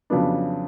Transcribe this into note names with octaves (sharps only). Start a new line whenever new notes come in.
F2 C#3 F#3 B3 D4